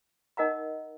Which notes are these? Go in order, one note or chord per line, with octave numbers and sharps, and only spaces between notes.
D#4 A#4 D#5 F#5 A#5